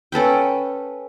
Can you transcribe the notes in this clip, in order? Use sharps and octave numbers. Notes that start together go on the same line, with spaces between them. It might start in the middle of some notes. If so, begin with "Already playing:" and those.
C#4 A4 B4 G5